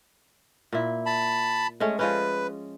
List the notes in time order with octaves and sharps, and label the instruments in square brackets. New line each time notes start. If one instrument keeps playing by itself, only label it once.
[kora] A#2 E4
[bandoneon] A5 B5
[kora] G#3 A3 C#4
[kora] F3 G#3 C#4 [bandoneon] B4